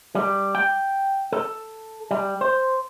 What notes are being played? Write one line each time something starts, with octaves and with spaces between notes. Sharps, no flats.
G3
G5
A4
G3
C5